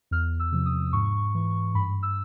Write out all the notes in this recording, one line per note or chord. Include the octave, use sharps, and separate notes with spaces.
E2 F6
E6
C3 F3
D#6
G#2 C#6
E3
G2 B5
E6